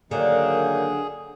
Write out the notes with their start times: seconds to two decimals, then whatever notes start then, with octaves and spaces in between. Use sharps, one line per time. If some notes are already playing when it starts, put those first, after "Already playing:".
0.11 D3 D#3 F#3 A#3 G#4